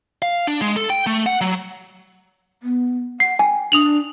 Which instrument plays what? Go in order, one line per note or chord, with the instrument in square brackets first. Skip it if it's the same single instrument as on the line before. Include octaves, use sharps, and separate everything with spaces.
[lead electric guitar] F5
D4
G#3
A4
G5
A3
F#5
F#3
[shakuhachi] B3
[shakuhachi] F#5 [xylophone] C7
[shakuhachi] G5 [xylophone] G#5
[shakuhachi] D4 [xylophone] D#6 F7 F#7